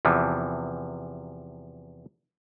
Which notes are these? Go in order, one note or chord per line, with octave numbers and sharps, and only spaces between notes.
E2 C3 E3 F3